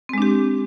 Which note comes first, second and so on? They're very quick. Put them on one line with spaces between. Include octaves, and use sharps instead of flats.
C4 G#3 D4 G4